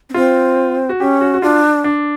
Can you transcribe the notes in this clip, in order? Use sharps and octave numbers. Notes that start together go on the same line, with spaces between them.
C#4
C4 F4
F#4
C#4 G4
F#4
F#4
D4 F4
D4